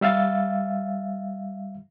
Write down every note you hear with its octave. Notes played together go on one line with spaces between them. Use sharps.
G3 E5 F5 A6